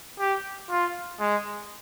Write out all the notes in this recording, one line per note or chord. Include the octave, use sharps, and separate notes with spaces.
G4
F4
G#3